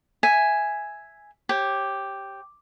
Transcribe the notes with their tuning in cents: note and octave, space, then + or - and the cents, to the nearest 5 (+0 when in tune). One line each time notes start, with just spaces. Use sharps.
E5 +0 G#5 +0
G4 +0 C#5 -35